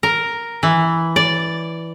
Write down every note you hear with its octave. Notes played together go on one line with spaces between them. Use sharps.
A#4
E3
D5